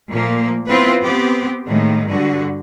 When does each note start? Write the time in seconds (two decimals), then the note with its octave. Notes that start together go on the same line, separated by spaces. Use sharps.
0.10 A#2 F3 A3 A#3
0.67 B3 C4 E4 F4 B4
1.02 B3 C4 G4
1.66 A2 D#3 G#3 A#3
2.08 G2 D3 F#4